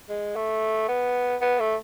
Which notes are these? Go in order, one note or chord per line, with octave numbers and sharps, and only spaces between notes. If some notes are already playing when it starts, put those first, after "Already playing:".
G#3
A3
B3
B3
A3